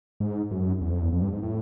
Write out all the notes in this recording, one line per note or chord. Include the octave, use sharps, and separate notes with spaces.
G#2
F#2
E2
F2
E2
F2
G2
G#2
A2